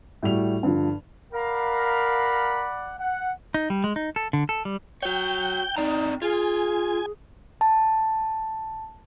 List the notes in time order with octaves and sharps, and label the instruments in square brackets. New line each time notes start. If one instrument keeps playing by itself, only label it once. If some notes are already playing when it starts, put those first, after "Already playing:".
[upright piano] A2 G3 F#4 F7
G2 D3 F3
[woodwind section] A#4 F5 A#5 [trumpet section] D5 F#5 B5
[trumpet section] F#5
[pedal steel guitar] D#4
G3
G#3
D#4
A4
D3
A4
G3
[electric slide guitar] F#4 C#5 [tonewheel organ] G5 G6
[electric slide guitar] C4 D5 A#5 [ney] D#4
[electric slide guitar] F4 [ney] G#4 [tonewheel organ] G#5
[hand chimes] A5